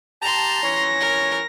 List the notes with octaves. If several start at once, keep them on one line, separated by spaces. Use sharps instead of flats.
G4 A5 A#5 C6
E3 C#4 C#5 A#6
A#4